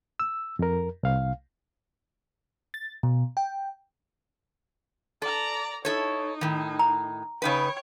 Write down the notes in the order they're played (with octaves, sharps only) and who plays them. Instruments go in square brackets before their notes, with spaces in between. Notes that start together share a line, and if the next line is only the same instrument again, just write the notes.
[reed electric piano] E6
F2 A#4
C2 F5
[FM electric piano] A6
B2
G5
[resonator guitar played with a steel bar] A4 [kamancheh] D5 A#5
[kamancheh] D#4 [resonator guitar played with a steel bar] E4 A4 C#5
[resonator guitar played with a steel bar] A2 D#3
[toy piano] A#5
[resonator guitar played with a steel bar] C#3 D#4 B4 [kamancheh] C#5 G5